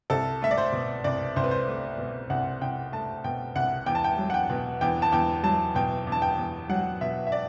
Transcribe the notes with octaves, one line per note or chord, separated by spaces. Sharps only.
C2 A4
A3 E5
D5
C5
B2
C2 D5
C2 C5
B4
C5
A3
B2
C2 F#5
C2 G5
A3 A5
B2 G5
C2 F#5
E2 G5
A5
G5
F#3
F#5
G5
B2
E2 G5
A5
E2 G5
F#3 A5
B2 G5
E2
A5
G5
E2
F#3 F#5
B2 E5
E5
D5